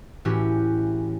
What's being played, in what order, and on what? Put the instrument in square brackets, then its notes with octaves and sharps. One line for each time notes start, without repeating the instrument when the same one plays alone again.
[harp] A2 E3 C#4 F#4 G4